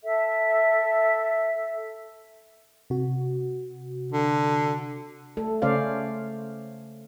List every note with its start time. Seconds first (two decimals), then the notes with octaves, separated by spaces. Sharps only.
0.03 A4 E5
2.90 C3 F#4
4.12 D3
5.37 A3 A4
5.62 C#3 A3 C#4 C5 D5 F5